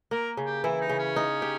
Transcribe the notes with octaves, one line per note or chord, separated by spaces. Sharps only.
A#3 A#4
C#3
G4
E3 E4
D#4
C#3
C#4
D#4
G4